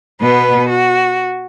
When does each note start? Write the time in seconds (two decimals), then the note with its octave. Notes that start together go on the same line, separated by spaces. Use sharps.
0.21 B2 B3 B4
0.69 F#4